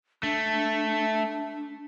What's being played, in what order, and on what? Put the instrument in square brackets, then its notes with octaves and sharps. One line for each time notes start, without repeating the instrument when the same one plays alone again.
[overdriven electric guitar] A3 [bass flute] D4